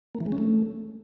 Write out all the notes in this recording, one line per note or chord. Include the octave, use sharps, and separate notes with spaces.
A#3
E3
G#3
C#4
A3